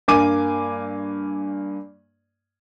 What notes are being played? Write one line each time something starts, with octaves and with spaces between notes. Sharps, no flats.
G2 A#3 G#5 D6 D#7